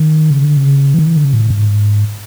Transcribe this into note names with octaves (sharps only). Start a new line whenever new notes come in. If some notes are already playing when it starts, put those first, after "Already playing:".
Already playing: D#3
C#3
D3
C#3
E3
D#3
E3
D3
C#3
A2
G#2